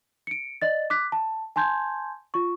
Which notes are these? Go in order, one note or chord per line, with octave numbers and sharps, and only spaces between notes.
C#7 D7
D5 D#5 A6
D6 F#6 B6
A5
G#5 A5 C6 G6 G#6
F4 C#6